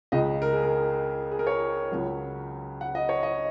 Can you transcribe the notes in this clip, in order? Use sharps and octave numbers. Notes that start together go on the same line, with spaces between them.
C#2 C#3 G#3 D#5
A#4
G#4
A#4
G#4
A#4
C#5
C#2 C#3 F#3
F#5
D#5
C#5
D#5